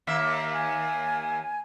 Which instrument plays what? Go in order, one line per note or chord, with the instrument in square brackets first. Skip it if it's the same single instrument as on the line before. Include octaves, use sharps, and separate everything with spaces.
[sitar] D#2 A#3 E5
[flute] G#5